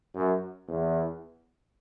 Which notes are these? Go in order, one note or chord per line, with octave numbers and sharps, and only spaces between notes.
F#2
E2